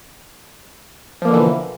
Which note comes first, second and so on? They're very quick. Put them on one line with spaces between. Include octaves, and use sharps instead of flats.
F3 A#3 B2 D3 E3